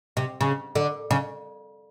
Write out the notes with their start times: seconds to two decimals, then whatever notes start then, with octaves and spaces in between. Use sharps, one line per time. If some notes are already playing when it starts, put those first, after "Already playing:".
0.17 C3
0.41 C#3
0.75 D3
1.11 C#3